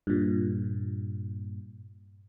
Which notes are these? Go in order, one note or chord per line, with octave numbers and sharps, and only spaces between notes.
G2 A#2